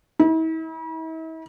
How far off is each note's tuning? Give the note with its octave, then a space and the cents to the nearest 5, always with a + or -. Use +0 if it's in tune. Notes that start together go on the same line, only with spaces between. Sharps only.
E4 -45